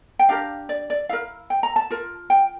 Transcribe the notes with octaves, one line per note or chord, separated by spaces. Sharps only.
G5
D4 G4 A#4 F5
D5
D5
E4 A#4 F5
G5
A#5
A5
F4 A#4
G5